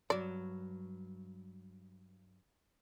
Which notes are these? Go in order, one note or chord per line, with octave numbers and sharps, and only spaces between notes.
G2 F#3 D5